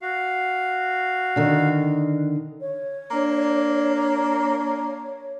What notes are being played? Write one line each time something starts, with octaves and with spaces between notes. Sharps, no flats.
F#4 F5
D3 D#3
C#5
A#3 D4